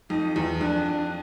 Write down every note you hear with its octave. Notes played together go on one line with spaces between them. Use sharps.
F2 D#4
E2
F2 D4